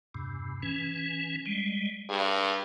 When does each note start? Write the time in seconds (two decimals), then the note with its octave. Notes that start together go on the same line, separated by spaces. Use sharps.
0.15 E2 G2 C3
0.63 E3 C#4
1.46 G3 G#3
2.09 G2 G#4